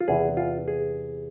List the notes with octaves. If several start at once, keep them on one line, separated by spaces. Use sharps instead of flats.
F4
E2 C3 E3 G#4
F4
G#4